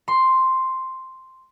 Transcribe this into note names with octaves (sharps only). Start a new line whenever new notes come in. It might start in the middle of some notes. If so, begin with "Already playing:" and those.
C6